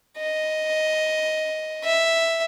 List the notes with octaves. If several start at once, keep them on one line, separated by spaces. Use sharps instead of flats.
D#5
E5